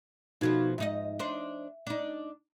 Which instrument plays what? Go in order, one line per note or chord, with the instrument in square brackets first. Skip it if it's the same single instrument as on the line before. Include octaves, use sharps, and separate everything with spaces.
[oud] B2 F3 A3 [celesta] D#4 F#4 G#6
[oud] G#2 D#4 D#5 [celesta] E5
[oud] D4 D#4 C5
D4 D#4